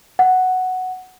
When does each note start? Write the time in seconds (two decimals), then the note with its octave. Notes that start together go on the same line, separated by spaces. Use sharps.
0.19 F#5